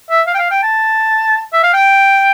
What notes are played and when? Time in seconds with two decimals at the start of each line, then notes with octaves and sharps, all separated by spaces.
0.10 E5
0.27 F5
0.34 G5
0.39 F5
0.51 G5
0.63 A5
1.53 E5
1.63 F5
1.73 G5